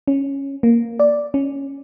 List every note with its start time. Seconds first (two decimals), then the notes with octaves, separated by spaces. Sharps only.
0.08 C#4
0.63 A#3
0.99 D5
1.34 C#4